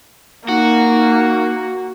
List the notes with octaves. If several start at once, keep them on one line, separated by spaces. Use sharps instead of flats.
A#3 D#4 F#4